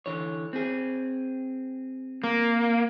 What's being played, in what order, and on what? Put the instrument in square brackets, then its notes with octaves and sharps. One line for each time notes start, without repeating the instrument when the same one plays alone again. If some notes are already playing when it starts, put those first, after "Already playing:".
[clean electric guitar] D3 E3 C#5
C4 G#4
[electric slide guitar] A#3